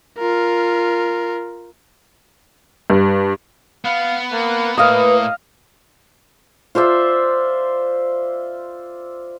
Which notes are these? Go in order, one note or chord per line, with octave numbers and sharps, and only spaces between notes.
F4 A#4
G2
B3 F5
A#3
A2 A#3 B4 D#5 F5
F4 C5 D5 E5